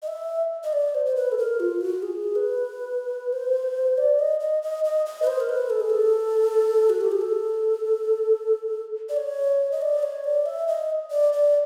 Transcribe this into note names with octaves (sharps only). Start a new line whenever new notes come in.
D#5
E5
D#5
D5
C5
C5
B4
A4
A#4
F4
F#4
G#4
B4
C5
D5
D#5
D#5
D#5
D#5
D#5
B4
C5
A#4
B4
A4
G#4
A4
F#4
G4
G#4
A4
D5
C#5
D#5
D5
C#5
D5
E5
D#5
D5
D5